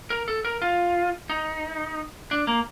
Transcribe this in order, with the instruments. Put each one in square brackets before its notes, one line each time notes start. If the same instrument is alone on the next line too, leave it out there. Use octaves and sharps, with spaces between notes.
[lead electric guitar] A#4
A4
A#4
F4
D#4
D4
A#3